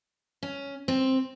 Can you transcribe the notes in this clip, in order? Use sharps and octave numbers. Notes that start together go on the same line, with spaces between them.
C#4
C4